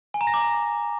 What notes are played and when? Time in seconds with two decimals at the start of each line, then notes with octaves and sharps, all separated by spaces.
0.14 G#5
0.21 A#5
0.27 A#6
0.34 D6